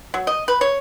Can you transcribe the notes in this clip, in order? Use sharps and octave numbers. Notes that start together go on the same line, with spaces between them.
F#3
D#5
B4
C#5